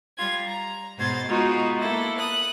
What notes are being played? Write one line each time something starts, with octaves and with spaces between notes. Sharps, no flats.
G3 F4 G#6
A#5
G#2 B2 C5 C6 G#6 A6
G#3 B3 D#4 F4 F#4
A#3 E4 A4
D#6 F#6